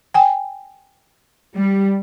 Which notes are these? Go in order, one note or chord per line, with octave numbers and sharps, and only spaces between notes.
G5 G#5
G3